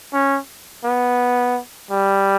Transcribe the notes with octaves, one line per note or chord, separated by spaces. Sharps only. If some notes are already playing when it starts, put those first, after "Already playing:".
C#4
B3
G3